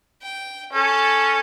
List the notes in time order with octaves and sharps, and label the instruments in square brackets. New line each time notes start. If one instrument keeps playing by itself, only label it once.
[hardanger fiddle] G5
[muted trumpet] C#4 [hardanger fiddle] A4 A5